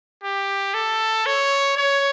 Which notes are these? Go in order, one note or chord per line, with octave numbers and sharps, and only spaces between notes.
G4
A4
C#5
C#5